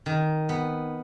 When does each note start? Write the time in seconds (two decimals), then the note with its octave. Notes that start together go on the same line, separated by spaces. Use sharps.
0.06 D#3
0.49 B3